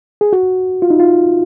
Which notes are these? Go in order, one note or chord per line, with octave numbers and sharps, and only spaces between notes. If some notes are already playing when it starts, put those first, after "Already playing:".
G#4
F#4
F4
D#4
F4